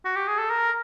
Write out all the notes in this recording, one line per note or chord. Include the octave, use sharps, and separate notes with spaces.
F#4
G4
G#4
A4
A#4